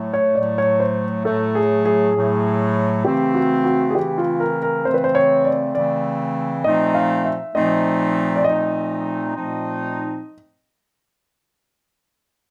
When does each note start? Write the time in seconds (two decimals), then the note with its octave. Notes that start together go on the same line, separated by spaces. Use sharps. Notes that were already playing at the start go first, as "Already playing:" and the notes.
Already playing: A2 F#3 A3
0.13 C#5
0.35 A2 F#3 A3 D5
0.58 C#5
0.80 C5
1.25 A2 F#3 A3 A4
1.55 G#4
1.85 G#4
2.15 A2 F#3 A3
3.05 C#3 E3 A3 C4 G4
3.34 F#4
3.65 F#4
3.90 G#4
3.94 C#3 E3 A3 C4 G4
4.18 F4
4.40 A#4
4.62 A#4
4.85 C#3 E3 A3 C4 C5
4.94 B4
5.04 C5
5.15 C#5
5.45 D5
5.75 C#3 E3 A3 C4 D5
6.64 A#2 F3 A3 C4 D#4 D#5
6.95 F5
7.25 E5
7.55 A#2 F3 A3 C4 D#4 D#5
8.36 D5
8.44 A#2 F3 A3 C4 D#4 D#5
9.35 A#2 F3 A3 C4 D#4